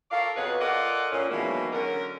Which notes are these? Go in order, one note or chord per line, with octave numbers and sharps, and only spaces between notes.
A4 A#4 C#5 D5 F5
F2 B2 F#4 G#4 B4 C#5
F4 A4 A#4 D5 D#5 F#5
A#2 C#4
B2 D#3 E3 F#3 G#3 A#3
D3 F#3 C#4 A#4